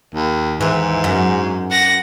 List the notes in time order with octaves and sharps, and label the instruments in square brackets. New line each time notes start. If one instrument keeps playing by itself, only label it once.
[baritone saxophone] D#2
[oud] D#2 E3 [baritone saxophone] G#2
[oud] F#2
[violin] F#5 A#6